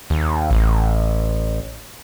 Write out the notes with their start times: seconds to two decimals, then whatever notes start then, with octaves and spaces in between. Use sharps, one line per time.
0.10 D#2
0.50 A1